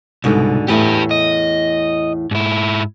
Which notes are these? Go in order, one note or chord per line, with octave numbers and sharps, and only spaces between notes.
C2 G#2 B2 D3
E2 A2 G4 B4 E5
D#5
G#2 E4